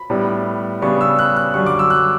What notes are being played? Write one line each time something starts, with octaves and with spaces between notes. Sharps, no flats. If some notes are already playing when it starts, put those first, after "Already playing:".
Already playing: B5
A2 G3 B3 D4
C#3 G3 B3 D4 C#6
E6
F#6
F#6
F#2 D3 G3 C#6
D6
E6
F#6